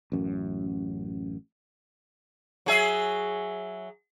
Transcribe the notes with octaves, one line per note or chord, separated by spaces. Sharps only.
A1 F#2
F#3 G#4 E5